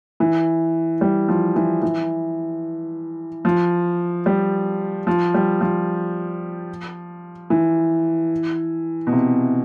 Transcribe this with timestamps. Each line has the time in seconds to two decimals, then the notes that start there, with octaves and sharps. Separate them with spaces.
0.20 E3
1.01 G3
1.29 F3
1.56 E3
1.82 E3
3.45 F3
4.26 G3
5.07 F3
5.34 G3
5.61 F3
7.50 E3
9.07 B2
9.13 C3